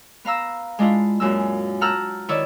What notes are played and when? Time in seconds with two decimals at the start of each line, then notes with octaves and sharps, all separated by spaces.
0.25 B3 F5 A#5 E6
0.79 G#3 D4 E4 F4
1.20 F#2 A#2 G#3 A#3 E6
1.81 F#5 A5 A#5 E6 F6 G6
2.29 D#3 E4 C#5 D5 E6